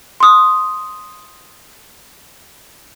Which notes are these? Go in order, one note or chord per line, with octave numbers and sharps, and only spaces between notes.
C6 D#6